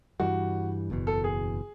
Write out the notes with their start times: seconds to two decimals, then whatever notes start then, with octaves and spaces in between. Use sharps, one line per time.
0.20 G2 E3 G3 F#4
0.90 F#1 E2 B2
1.07 A4
1.24 G#4